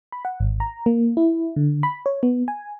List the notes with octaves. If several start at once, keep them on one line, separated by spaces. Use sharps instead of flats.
B5
F#5
G#1
A#5
A#3
E4
D3
B5
C#5
B3
G#5